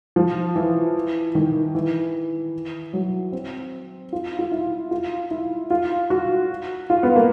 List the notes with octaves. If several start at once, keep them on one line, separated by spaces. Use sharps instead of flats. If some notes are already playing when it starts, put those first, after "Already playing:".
F3
E3
D#3
E3
F#3
C4
F4
F4
E4
F4
E4
F4
F#4
F4
B3
A#3